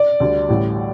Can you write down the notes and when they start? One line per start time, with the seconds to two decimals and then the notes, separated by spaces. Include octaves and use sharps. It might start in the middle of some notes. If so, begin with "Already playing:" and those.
Already playing: D5
0.20 D2 D3 G3
0.48 A1 A2 G3